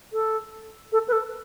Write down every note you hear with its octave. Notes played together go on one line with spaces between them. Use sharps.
A4
A4
B4
A4